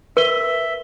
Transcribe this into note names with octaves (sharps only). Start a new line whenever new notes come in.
A#4 B4 E5 G7